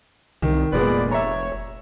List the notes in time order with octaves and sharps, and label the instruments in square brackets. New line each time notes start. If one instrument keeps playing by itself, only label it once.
[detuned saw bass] C2 [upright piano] D#3
[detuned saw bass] F1 [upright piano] A#2 G#3 B3 [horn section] G#4 B4 D5
[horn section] C#5 [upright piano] E5 A#5